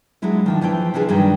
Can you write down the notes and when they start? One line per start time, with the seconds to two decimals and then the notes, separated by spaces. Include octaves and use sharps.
0.22 F#3 G#3 D4 E4 F4
0.46 D#3 F3 D4
0.61 E3 F3 E4 G5
0.94 C3 E3 F3 D4 G#4
1.09 G2 D#3 F#3